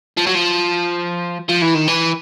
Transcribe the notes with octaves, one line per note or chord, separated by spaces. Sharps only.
F3
F#3
F3
F3
E3
D#3
E3